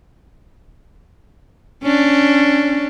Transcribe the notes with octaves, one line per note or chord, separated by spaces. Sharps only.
C#4 D4